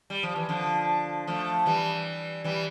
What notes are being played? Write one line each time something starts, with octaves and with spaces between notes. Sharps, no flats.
G3
F3
E3
D3 F3
F3 A3
E3 G3
E3 G3